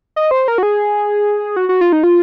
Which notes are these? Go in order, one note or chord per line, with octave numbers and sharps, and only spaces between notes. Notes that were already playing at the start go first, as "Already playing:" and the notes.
D#5
C5
A#4
F#4
G#4
F#4
F#4
F4
D#4
F4